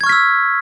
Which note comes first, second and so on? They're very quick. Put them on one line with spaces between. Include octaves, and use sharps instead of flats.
G#6 C#6 F6 B6 E6